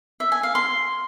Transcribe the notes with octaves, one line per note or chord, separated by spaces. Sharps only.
E5
G#5
F5
C6